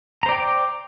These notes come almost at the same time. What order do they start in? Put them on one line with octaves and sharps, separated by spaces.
A#5 C5 D5 G5 D6